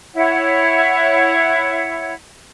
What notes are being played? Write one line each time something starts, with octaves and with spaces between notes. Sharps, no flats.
E4 C#5 F#5